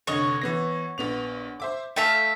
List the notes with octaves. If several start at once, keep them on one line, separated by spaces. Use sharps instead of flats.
F1 D3 C#5 D#5
E3 B3 A#6
A#1 B3 F7
C5 E5 D6
A3 E5 F5 G5 A5